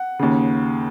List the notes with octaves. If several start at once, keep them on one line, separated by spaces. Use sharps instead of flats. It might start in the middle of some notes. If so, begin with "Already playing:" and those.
Already playing: F#5
D#2 C#3